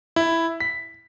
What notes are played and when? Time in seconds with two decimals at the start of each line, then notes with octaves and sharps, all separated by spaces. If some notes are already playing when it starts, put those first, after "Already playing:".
0.16 E4
0.60 B6